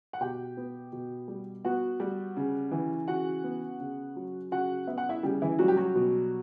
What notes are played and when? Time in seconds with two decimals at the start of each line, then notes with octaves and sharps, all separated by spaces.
0.13 F#5
0.21 B2 G4 G5
0.57 B3
0.92 B2
1.28 G3
1.65 B3 F#4 F#5
2.00 G3
2.37 C#3
2.71 E3
3.08 C#3 F#4 F#5
3.44 B3
3.80 C#3
4.16 F#3
4.51 C#3 F#4 F#5
4.87 B3 E5
4.98 F#5
5.09 E4 E5
5.23 C#3 G3 G4
5.42 E3 E4
5.59 F#3 G3 F#4
5.68 G4
5.77 F#3 F#4
5.95 B2